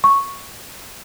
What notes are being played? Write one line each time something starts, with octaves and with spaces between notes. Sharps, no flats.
C#6